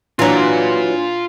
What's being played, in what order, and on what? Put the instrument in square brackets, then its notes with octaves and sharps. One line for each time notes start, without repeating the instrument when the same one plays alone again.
[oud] E3 F#3 [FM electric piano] D4 G#5 C6 [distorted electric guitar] F4 A#5